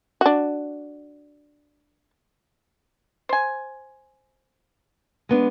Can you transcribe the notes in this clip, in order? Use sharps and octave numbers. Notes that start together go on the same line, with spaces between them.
D4 F#4
C5 G#5
G#3 B3 D4